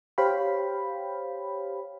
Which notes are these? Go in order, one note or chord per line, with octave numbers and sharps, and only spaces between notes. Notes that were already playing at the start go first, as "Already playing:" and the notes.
G4 C5 C#5 F5 G5 B5